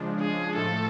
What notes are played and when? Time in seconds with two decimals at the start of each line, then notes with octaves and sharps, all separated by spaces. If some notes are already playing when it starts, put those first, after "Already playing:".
Already playing: C#3 F3 G#3 D4
0.21 G#4
0.56 A2 F3 A3 A4